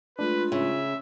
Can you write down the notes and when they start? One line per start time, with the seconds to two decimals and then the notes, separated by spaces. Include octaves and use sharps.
0.19 G#3 A3 D4 F4 B4
0.52 C#3 E5